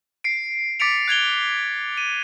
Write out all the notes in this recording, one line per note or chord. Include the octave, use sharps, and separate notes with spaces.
C7 D7
D6 A6 B6 C#7 D7 F7
F#6 G#6 F7 G7
D#7